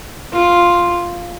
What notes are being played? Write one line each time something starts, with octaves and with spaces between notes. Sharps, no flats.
F4